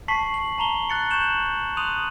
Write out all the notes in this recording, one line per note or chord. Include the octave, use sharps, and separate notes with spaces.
A5 C#6 B6 C7 F#7
F#7
A5 A#5 F7 G7
F#6 A6 C#7
C#6 F#6 G6 E7 F#7
C6 D#6 F#6 D#7 F7 F#7